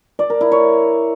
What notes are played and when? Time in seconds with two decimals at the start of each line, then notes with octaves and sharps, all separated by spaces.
0.19 D5
0.30 A#4
0.41 E4
0.52 C#5